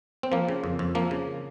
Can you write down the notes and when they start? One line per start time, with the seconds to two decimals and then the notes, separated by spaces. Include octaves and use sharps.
0.23 C4
0.32 F3 A#3
0.49 C#3
0.64 F2
0.79 F2
0.95 F3 A#3
1.11 C#3